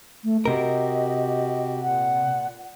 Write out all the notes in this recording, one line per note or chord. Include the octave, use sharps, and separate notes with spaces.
A3
C3 F#4 G4 A#4 D#5
A#2 F#5